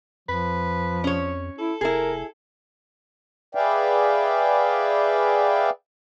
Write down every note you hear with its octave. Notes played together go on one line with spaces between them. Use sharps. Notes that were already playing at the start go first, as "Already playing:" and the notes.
F2 F3 B4
C#4 C#5
E4 A4
F1 E4 G#4 A#4
G#4 B4 D5 E5 F5 G5